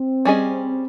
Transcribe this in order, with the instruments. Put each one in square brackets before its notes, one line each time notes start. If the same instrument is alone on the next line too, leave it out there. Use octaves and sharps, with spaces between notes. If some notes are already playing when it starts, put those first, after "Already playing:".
Already playing: [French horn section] C4
[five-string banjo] G3 C#4 G#4 D#5